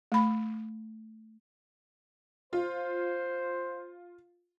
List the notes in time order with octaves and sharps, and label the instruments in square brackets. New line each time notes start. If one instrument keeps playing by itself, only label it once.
[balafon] A3 B5
[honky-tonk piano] F4 [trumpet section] C5